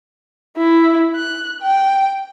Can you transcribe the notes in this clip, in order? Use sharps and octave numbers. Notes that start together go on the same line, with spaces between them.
E4
F#6
G5